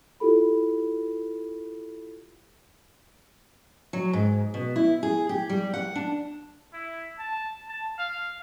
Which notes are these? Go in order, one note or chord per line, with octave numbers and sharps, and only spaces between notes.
E4 F4 G4 A4 B5
F#3
G#2
B2
E4
G#4
G4
G3
F#5
D4
E4
A5
A5
F5